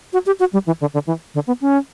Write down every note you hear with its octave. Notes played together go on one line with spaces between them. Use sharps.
F#4
G4
F#4
G3
E3
D3
D3
E3
D3
B3
C#4